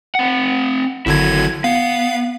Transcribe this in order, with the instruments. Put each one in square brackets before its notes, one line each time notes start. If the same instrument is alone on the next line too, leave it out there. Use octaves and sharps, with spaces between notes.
[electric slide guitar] C4 F#5
[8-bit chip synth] G#1 D3 G#6 [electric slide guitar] F#3 E4
[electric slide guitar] B3 [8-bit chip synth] F5